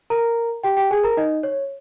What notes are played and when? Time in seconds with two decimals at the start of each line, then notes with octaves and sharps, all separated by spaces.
0.10 A#4 A#5
0.64 G4 G5
0.77 G4 G5
0.91 G#4 G#5
1.03 A#4 A#5
1.17 D#4 D#5
1.43 C#5